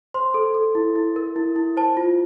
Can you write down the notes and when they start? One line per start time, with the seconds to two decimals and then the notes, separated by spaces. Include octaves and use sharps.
0.14 C5 C6
0.34 A4
0.54 A4
0.75 E4
0.96 E4
1.16 A#4
1.36 E4
1.56 E4
1.77 C5 A5
1.97 F4